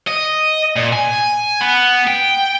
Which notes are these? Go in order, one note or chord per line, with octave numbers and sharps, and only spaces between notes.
D#5
A#2
G#5
B3
G5